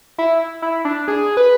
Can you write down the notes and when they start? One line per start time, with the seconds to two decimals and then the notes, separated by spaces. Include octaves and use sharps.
0.18 E4
0.62 E4
0.85 D4
1.08 G#4
1.37 B4